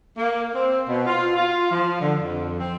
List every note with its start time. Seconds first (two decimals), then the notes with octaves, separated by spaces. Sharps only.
0.17 A#3
0.54 C4
0.88 B2
1.06 F4
1.35 F4
1.70 F3
2.00 D3
2.22 F2
2.59 C4